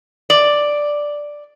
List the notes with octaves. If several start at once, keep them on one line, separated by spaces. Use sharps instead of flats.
D5